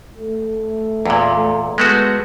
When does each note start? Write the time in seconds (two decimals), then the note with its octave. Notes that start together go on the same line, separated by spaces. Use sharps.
0.17 A3
1.06 E2 A#2
1.35 A3
1.78 G#3 A3 B3 F#4